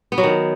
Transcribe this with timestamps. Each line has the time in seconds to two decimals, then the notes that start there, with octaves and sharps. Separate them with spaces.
0.12 B3
0.18 F#3
0.24 D#3